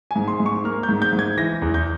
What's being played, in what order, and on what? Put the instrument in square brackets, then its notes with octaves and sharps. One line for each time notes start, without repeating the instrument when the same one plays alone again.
[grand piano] G#2 G#5
C6
G#2
C#6
A#3 F6
G6
G#2
G6
G#2
G#6
E3 A#6
E2
G6